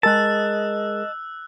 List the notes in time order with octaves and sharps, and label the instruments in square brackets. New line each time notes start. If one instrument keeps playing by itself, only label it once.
[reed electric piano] G#3 G#4 A#4 [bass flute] D#5 [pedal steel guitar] A5 [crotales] E6 F#6